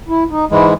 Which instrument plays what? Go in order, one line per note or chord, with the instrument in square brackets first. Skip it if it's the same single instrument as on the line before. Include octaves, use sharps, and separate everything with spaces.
[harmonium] E4
D#4
[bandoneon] G#2 E3 G#3 [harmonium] E4